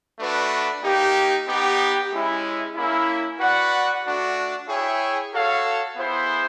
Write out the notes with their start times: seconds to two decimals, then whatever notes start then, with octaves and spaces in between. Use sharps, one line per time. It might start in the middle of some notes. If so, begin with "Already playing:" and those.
0.19 A3 D4 F#4 B4
0.83 A#3 D#4 G4
1.47 B3 D#4 G4
2.12 G#3 C#4 E4
2.75 A#3 C#4 E4
3.39 F#4 B4 D5 F#5
4.04 A3 D4 F#4
4.68 E4 G#4 C#5 E5 G5
5.32 F#4 A4 C#5 F5
5.96 B3 E4 G#4 C5